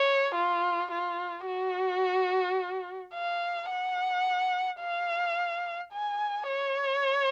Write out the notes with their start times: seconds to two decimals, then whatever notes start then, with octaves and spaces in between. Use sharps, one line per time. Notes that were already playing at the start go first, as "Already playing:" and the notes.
Already playing: C#5
0.35 F4
0.91 F4
1.46 F#4
3.14 F5
3.70 F#5
4.80 F5
5.93 G#5
6.49 C#5